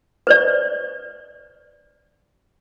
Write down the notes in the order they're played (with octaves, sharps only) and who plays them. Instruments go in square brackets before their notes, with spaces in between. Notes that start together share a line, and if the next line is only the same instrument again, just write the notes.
[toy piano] B4 C5 D5